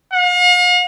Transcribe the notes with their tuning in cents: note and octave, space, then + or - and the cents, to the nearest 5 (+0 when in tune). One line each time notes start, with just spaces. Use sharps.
F5 +45